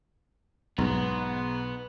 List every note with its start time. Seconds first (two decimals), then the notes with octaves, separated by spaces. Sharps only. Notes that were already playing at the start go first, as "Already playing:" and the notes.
0.78 B1 G#2 B2 B3